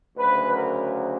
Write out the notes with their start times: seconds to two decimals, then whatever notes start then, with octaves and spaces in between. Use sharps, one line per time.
0.17 D2 C#3 F#3 B4
0.54 A#4